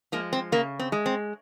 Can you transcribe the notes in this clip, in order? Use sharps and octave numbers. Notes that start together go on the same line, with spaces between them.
F3 G#3 A#3
C4
C#3 A#3
C4
G#3
C4